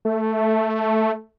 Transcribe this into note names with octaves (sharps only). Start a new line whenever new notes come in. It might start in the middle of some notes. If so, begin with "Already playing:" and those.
A3